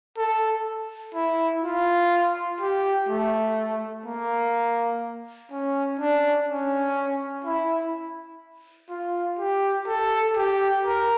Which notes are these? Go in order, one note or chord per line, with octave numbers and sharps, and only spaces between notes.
A4
E4
F4
G4
A3
A#3
C#4
D4
C#4
E4
F4
G4
A4
G4
A#4